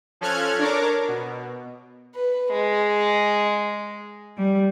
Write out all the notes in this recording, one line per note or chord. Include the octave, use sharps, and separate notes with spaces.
F3 C#4 A4 F6 F#6 G#6
D4 A#4 C#5 D6
B2
B4
G#3
G3